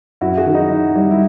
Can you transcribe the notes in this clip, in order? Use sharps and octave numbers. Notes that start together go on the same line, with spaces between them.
F#2 E4 F#4
F#4 G#4
D#3
D#4
D#3
G3
E4